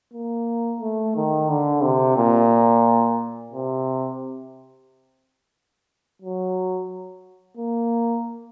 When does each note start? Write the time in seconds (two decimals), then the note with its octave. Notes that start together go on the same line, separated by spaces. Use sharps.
0.13 A#3
0.81 A3
1.15 D#3
1.49 D3
1.83 C3
2.17 A#2
3.51 C3
6.22 F#3
7.57 A#3